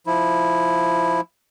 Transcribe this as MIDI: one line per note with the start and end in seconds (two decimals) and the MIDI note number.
0.07 1.21 53
0.07 1.21 64